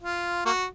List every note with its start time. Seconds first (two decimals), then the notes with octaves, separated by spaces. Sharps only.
0.01 F4
0.45 A#3 F#4